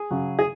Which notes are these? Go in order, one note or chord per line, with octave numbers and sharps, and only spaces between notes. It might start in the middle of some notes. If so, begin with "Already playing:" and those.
Already playing: G#4
C#3 F#3
G#4